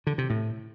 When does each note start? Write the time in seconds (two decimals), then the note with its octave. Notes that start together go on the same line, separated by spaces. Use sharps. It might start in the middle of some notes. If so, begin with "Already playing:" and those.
0.07 D3
0.18 C3
0.30 A2